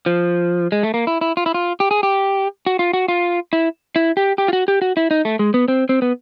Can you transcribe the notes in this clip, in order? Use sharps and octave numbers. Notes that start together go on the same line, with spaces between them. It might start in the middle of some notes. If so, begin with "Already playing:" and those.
F3
G#3
A3
A#3
E4
E4
F4
E4
F4
G4
G#4
G4
F#4
F4
F#4
F4
E4
E4
G4
G4
F4
F#4
G4
F#4
E4
D#4
A3
G#3
B3
C4
C4
B3